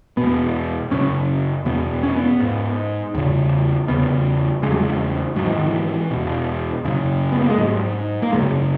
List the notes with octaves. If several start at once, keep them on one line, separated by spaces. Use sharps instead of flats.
E2 B2 B3
F#2 C#3 C#4
E2 B2 B3
C#4
B3
G#2
E2 C#3
E2 C#3 B3
E2 C#3 G#3
F#3
G#3
G#2 F#3
E3
D#3
E3
E2 B2
F#2 C#3
B3
A#3
G#3
G#2 F#3
A#3
F#2 C#3 G#3